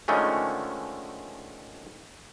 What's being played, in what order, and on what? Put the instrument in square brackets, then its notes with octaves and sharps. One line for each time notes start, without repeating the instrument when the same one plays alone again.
[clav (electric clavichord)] D3 D#3 F3 G#3 A3 C#4